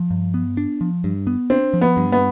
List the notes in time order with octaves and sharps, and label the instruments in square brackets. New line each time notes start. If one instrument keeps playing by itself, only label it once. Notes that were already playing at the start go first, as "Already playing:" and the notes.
Already playing: [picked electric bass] F3
G2
B3
D4
F3
G2
B3
[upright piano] C4 [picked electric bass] D4
[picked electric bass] F3
[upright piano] B3
[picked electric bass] G2
[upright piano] B3